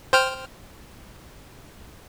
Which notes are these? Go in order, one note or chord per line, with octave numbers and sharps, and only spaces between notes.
C5 G5 F6